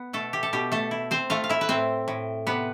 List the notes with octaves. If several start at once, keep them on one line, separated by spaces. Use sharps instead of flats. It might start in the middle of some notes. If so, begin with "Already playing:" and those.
Already playing: B3
B2 A3 A4
G4
A4
B2 G4
A3 A4
E4
C4 C5
A3 F4 F5
F5
E4 E5
B4
A2 C4 C5
A2
C3 B3 B4